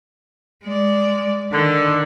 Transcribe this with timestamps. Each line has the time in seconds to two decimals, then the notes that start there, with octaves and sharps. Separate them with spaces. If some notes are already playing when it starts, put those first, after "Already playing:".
0.64 G#3 D5
1.51 D3 D#3